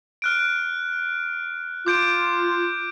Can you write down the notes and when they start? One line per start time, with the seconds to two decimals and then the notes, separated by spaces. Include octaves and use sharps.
0.22 F6 F#6 D7
1.86 F4 D6 G6 D7